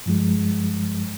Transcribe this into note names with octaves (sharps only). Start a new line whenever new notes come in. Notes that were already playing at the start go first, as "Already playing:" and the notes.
G2 F3 G#3